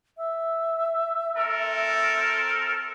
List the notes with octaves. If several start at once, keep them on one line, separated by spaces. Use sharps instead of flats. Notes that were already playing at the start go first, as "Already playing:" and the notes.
E5
C4 A4 A#4